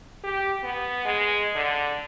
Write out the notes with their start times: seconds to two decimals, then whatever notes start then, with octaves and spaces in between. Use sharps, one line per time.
0.24 G4
0.63 B3
1.05 G#3
1.55 D3